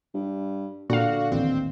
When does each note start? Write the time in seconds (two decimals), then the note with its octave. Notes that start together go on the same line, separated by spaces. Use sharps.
0.14 G2
0.90 A#2 D3 F#4 F5
1.32 A1 D#2 C4